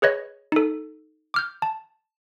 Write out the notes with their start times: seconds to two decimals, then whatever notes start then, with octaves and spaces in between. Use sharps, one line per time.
0.02 G#4 B4 C#5 D#5
0.52 D#4 A4
1.34 D6 F6 G6
1.62 A5